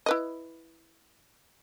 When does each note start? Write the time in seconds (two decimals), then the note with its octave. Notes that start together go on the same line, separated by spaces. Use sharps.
0.06 E4 B4 D#5